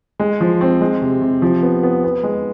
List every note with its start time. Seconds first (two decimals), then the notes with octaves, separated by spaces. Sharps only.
0.20 G#3
0.41 F3
0.61 C4
0.81 G#3
1.02 C3
1.21 C3
1.42 F3
1.63 B3
1.83 B3
2.04 B3
2.23 G#3